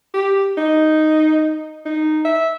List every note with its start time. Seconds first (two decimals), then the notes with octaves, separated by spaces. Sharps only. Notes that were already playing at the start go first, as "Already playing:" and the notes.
0.14 G4
0.57 D#4
1.86 D#4
2.25 E5